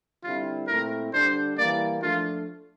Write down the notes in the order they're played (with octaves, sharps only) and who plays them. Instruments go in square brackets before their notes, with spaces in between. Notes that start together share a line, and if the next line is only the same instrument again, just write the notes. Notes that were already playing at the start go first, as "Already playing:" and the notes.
[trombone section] D3 G3 C4 E4 [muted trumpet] F4
[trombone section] A#2 A3 C4 E4 [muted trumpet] A#4
[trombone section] D3 G3 D4 [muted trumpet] C5
[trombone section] E3 G3 A#3 [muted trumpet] D5
[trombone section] F3 A3 D4 [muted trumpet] F4